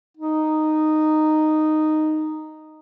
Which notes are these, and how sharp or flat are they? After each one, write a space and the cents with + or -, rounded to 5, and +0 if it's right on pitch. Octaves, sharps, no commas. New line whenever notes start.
D#4 -10